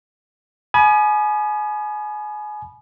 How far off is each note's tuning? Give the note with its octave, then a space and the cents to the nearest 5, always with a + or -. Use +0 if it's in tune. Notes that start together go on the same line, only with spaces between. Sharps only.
G#5 +30 B5 -20 D#6 -40